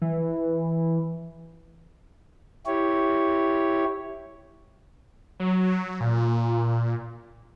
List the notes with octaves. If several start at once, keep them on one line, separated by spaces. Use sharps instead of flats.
E3
E4 G4 C#5
F#3
A#2